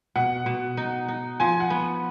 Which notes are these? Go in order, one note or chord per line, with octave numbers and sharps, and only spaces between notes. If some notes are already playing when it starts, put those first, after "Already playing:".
B2 F#5
B2
D#4
D#4
F3 G#5
F#5
B3